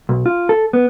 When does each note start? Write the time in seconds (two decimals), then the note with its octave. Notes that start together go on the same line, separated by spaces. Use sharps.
0.09 B1
0.26 F4
0.49 A4
0.73 B3